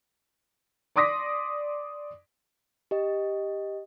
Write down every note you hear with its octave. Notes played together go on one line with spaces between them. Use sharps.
D5 C6 D6 D#6 A#6 B6
G4 D#5